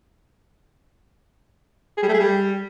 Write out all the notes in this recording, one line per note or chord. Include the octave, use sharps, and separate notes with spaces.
G#4
G3
A3
G#4
G3